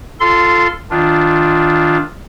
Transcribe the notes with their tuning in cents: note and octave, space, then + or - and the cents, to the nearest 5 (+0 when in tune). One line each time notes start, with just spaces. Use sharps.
F4 +0 A4 +0 C6 -15
D#3 +15 D4 +0 F4 +0